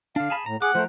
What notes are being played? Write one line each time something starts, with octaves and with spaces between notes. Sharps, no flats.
D3 D4 F5
G#4 A5 B5
A2 A#5
G#4 F#5 D6
F3 A3 A#4 C5